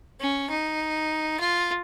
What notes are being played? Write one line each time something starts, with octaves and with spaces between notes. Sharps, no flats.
C#4
D#4
F4